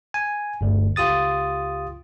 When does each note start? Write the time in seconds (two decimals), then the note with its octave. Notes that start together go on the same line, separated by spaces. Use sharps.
0.14 G#5
0.61 G1 D2
0.96 C#2 F4 G4 D#6 A6